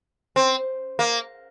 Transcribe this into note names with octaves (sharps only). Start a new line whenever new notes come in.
C4
A#3